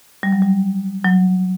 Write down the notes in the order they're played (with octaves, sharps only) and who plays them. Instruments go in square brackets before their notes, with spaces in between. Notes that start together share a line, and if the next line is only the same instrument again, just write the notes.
[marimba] G3
F#3
G3
F#3